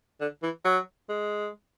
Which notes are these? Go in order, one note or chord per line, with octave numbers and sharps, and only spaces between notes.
D3
E3
F#3
G#3